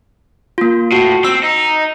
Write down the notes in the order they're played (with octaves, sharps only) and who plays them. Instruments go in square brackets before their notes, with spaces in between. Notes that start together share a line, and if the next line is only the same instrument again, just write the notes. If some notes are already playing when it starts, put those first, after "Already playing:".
[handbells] A#3 F4
[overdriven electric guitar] A2 [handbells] F#4
[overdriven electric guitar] C4 [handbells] E6
[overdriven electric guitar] D#4